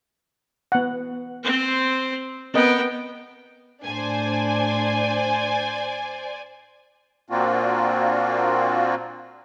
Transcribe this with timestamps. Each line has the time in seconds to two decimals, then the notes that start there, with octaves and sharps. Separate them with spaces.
0.72 B3 F#5
1.44 C4 C5
2.54 B3 C4 A#4 D#5 G5
3.85 A2 D4 C5 D5 G#5
7.30 A#2 A#3 C4 D4 F4 F#4